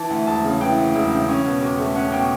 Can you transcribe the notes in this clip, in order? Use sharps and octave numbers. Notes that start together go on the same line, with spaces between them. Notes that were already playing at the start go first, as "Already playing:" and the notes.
Already playing: E3 A5
D2
E1 A5
C#3
E3 G5
D2
E1
C#3
C#4
B2
E2
A3
C#4 F#5
B2 G5